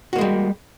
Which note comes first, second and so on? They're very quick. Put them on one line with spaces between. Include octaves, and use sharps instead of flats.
F#4 A#3 G#3 G3